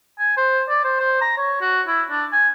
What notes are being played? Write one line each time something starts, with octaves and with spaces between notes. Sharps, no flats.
G#5
C5
D5
C5
C5
A#5
C#5
F#4
E4
D4
G#5